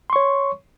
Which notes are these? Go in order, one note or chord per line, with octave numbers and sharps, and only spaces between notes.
C#5 C6 C#6